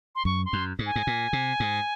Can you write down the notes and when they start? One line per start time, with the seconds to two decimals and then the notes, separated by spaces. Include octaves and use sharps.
0.16 C6
0.25 F#2 C#6
0.46 C6
0.53 F#2
0.79 G#2
0.86 G#5
0.96 G#2
1.07 A#2
1.33 C3
1.60 G#2